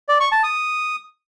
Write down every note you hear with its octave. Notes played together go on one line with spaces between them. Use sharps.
D5
C#6
A5
D#6